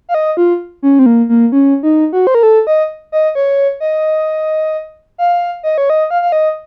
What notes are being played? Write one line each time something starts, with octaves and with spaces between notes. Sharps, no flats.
F5
D#5
F4
C#4
C4
A#3
A#3
C#4
D#4
F#4
C5
A#4
A4
D#5
D#5
C#5
D#5
F5
D#5
C#5
D#5
F5
F5
D#5